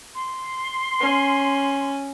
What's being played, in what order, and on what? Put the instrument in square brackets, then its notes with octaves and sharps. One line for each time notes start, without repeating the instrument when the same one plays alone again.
[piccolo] C6
[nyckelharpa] C#4